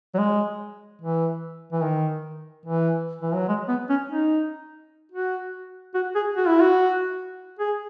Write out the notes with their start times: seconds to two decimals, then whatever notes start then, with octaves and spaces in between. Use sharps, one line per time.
0.14 F#3
0.18 G#3
1.01 E3
1.72 E3
1.83 D#3
2.66 E3
3.21 E3
3.34 F#3
3.48 G#3
3.68 B3
3.89 C#4
4.10 D#4
5.12 F#4
5.94 F#4
6.15 G#4
6.36 F#4
6.47 E4
6.61 F#4
7.59 G#4